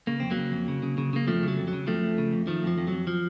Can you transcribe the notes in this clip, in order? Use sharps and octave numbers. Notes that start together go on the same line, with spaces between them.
C#3 A#3
F2 C4
F#3 A#3
C#3
F2
C#3
C#3
C#3
C#3 A#3
F2 F3 A3
C#3 F#3
F2
F#3
C#3
F2 F3 A3
F2
C#3
F2
D#3 F3 A3
F2 F3
F2
F2 F#3
F3